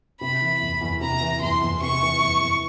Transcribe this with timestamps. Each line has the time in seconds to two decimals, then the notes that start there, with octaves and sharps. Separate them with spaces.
0.21 C3 B5
0.41 E3
0.61 E2
0.81 E2
1.01 C3 A#5
1.21 E3
1.41 E2 C6
1.61 E2
1.81 C3 C#6
2.01 E3
2.21 E2
2.41 E2